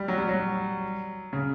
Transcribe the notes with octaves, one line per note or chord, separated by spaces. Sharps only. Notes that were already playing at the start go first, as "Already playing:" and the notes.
Already playing: G3
F#3
G3
F#3
C#3